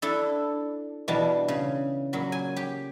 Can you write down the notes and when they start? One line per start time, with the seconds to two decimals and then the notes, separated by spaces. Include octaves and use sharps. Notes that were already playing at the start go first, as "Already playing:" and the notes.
0.02 D4 E4 A4
1.08 B2 E3 G3 D4 A5
1.48 C#3
2.13 A#2 F#3 B5
2.32 G#5
2.56 G4